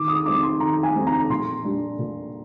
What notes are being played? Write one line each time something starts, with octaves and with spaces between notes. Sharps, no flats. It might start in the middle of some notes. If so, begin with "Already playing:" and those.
Already playing: D#3 D6
D#6
G3 C4 D#4 D6
C6
D#3 A#5
G#5
G3 C4 D#4
A#5
A#2 C6
G3 D4
A#2